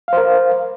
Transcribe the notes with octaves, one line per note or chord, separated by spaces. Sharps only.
A#4 C5 F5